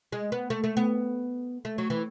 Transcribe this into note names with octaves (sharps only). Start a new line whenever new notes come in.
G#3
B3
A3
A3
B3
A3
F#3
E3